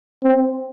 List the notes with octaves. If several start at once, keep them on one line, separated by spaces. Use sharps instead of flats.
C4